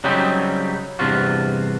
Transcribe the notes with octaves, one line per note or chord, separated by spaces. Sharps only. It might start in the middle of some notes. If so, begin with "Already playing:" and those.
C#3 F#3 G3 C4 C#4 D#4
E2 G2 C3 F4 F#4